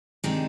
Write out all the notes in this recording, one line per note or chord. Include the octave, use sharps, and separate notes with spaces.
C3 D#3 G#3 D4